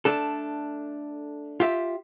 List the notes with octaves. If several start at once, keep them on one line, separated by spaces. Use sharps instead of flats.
A3 D4 A4
F4 G4 E5